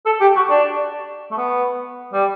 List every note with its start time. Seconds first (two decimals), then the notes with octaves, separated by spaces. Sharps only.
0.06 A4
0.21 G4
0.36 F#4
0.50 D4
1.31 A3
1.37 B3
2.13 G3